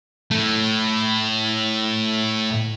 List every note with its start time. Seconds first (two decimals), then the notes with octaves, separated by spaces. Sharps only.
0.31 A2 A3